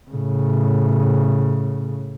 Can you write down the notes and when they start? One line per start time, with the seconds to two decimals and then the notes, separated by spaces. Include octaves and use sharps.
0.10 A2 C#3